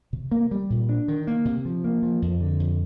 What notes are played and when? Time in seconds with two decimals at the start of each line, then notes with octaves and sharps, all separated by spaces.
0.13 C3
0.31 A#3
0.51 G3
0.70 A#2
0.89 D4
1.08 D#3
1.27 A#3
1.45 C3
1.65 F3
1.84 A#3
2.03 F3
2.22 F2
2.40 D3
2.60 F2